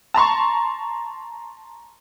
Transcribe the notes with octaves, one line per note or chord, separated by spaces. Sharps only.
A5 A#5 C6 C#6